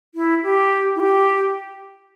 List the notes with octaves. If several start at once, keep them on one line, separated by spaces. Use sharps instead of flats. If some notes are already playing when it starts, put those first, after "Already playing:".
E4
G4
E4
G4